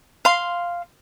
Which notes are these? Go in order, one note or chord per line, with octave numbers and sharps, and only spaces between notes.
F5 C6